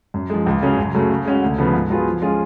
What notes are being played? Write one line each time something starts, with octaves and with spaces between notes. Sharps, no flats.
F#2
F3 G#3
C#2
C#3 F#3 C#4 G#4
F#2
C#3 F#3 A3
C#3
G#3 C#4 F#4
D2
C#3 F3 B3
G#2
F#3 B3 F4 G#4
F3
G#3 C#4 F4 G#4